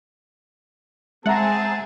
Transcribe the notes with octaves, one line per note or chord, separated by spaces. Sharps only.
G#3 C4 G#4 E5 F#5 A5 A#5